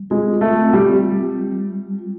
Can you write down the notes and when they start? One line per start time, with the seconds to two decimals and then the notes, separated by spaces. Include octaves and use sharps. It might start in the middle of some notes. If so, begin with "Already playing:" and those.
Already playing: G3
0.10 G#3 F4
0.41 A3
0.57 C4
0.73 G3
1.05 G3
1.52 G3
1.98 F4